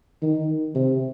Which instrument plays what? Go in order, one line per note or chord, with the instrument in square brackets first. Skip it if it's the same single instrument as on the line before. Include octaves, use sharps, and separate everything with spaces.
[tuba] D#3
C3